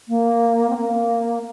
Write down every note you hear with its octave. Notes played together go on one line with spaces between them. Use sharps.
A#3
C4
A#3